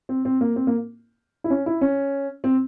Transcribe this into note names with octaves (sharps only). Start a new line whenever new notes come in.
C4
C4
A#3
C4
A#3
E4
C#4
E4
C#4
C4